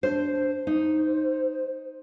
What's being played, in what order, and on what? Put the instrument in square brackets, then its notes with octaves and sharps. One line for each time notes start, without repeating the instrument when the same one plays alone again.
[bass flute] D4 [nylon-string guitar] C5
[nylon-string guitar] D#4 [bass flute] C5